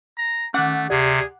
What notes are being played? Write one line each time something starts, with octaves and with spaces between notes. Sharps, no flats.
A#5
D#3 A3 C#4 F#5 D6 F#6
D2 C3 G4 G#4 D5